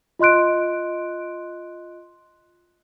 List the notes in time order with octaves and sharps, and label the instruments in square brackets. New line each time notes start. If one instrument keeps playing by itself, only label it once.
[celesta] F4 D#5 C6 F#6 D7